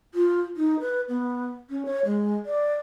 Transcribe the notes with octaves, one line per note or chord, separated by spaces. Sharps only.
F4
D#4
B4
B3
C#4
C#5
G#3
D5